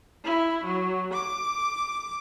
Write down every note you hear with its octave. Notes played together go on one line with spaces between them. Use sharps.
E4
F#3
D6